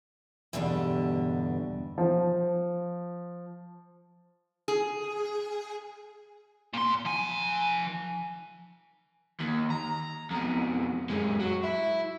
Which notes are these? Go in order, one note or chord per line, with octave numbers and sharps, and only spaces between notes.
E2 G2 B2 D3 G3 D4
F3
G#4
A#2 C6
F3 G#5
D#2
A#5
F2 B2
F#2 G#3
F#3
E4